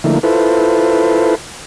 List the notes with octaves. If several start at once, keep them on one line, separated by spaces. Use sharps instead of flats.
D3 F3 A3 A#3 D#4 E4
E4 F4 A4 B4 C5